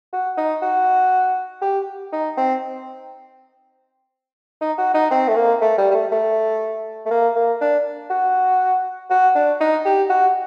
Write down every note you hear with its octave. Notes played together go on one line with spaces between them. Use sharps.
F#4
D#4
F#4
G4
D#4
C4
D#4
F#4
D#4
C4
A3
A#3
A3
G3
G3
A3
A3
A3
A#3
A#3
D4
F#4
F#4
D4
D#4
G4
F#4